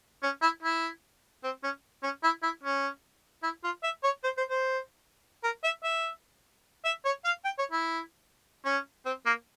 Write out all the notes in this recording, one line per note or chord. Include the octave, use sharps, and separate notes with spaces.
C#4
E4
E4
C4
C#4
C#4
E4
E4
C#4
E4
F4
E5
C#5
C5
C5
C5
A#4
E5
E5
E5
C#5
F5
G5
C#5
E4
C#4
C4
A#3